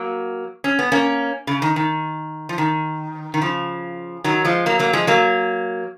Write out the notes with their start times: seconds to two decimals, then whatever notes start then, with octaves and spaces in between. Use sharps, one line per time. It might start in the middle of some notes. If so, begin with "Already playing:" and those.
Already playing: F#3 A#3
0.64 C#4
0.79 B3
0.92 A#3 C#4
1.47 C#3
1.62 D#3
1.76 D#3
2.49 F3
2.58 D#3
3.34 D#3
3.41 C#3 F3
4.24 D#3 F#3
4.45 F3 G#3
4.66 F#3 A#3
4.79 F#3 A#3
4.93 F3 G#3
5.07 F#3 A#3